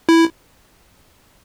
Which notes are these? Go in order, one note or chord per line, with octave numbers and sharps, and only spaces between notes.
E4